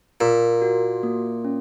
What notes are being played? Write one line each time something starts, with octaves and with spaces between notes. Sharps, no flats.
A#2 A#4
F#4
A#3
C#4